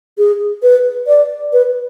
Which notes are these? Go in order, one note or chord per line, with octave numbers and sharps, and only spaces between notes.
G#4
B4
D5
B4